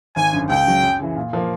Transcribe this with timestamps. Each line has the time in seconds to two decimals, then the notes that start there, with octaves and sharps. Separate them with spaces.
0.16 G#1 G#5
0.33 F#2 D3
0.50 C#2 G5
0.66 C#3 F#3
0.83 F#2
0.99 C#3 E3
1.16 A#2
1.33 F3 A#3